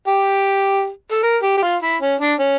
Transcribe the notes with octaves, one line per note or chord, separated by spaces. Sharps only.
G4
A4
A#4
G4
G4
F4
E4
C#4
D4
C#4